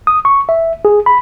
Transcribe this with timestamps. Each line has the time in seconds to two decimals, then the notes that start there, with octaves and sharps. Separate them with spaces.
0.07 D#6
0.25 C#6
0.49 E5
0.85 G#4
1.06 B5